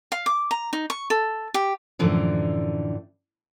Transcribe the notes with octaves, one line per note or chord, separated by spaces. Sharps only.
F5
D6
A#5
D#4
C#6
A4
G4
F#2 A2 D3 E3 F3